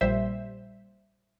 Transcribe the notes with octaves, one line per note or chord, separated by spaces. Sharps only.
A#1 A#2 G3 C5 E5